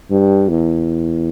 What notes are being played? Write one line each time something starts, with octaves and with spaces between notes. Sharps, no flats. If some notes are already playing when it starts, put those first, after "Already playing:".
G2
E2